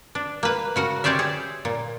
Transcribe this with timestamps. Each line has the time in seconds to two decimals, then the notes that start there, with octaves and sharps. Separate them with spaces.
0.15 D4
0.43 A#3 B4
0.76 C#3 F#4 A#4
1.04 C#4 G4 C5 D5 E5
1.19 G#4
1.65 A#2